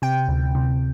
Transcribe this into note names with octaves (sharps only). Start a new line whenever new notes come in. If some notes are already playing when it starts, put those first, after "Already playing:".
C3 G5
D2
C3